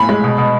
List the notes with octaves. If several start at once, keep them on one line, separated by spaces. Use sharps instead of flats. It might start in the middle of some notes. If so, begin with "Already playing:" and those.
Already playing: A2 G#5 B5
G#3
B2
B2